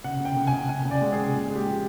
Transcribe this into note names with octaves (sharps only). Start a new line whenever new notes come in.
C#3 F#5
C#3
G5
C#3
G#5
C#3
C#3 G#5
C#3
D5
G#3
G#4
C#3
A#2
G#3
G4
F3